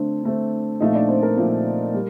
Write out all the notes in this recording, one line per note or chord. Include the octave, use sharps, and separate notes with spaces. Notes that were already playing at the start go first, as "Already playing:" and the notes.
Already playing: D3 A3 C4 D4
D3 A3 C4
A#2 F3 A3 C4 D#4 D#5
D4 D5
C4 C5
A#4
A#2 F3 A3 C4
G3